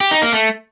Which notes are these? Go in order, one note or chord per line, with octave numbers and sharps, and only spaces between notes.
G4
D#4
A#3
A3